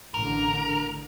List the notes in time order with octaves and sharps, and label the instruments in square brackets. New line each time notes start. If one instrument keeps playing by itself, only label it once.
[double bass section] A1 D3 [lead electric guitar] A#4